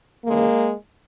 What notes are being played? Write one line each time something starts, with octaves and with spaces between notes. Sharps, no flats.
D#2 C#3 E3 G#3 A#3